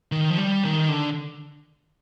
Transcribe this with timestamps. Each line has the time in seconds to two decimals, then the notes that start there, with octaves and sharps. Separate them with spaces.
0.12 D#3
0.30 F3
0.38 G3
0.64 D#3
0.89 D3